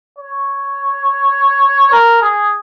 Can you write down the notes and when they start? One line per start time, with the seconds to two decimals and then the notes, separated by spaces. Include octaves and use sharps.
0.18 C#5
1.92 A#4
2.22 G#4